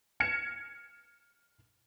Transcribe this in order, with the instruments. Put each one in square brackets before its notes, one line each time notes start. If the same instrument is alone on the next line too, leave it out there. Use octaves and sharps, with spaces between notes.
[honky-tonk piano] F6 G#6 A#6 C#7 E7